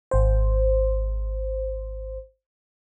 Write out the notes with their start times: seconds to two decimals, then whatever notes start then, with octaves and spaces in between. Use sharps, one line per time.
0.11 G#1 C5